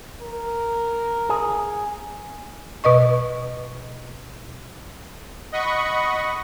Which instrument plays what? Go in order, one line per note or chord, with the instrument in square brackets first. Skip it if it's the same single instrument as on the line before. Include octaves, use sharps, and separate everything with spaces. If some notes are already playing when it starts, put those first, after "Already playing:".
[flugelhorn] A#4
[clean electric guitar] G#4
[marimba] B2 B4 D#5 C#6
[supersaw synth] D#5 F#5 B5 C#6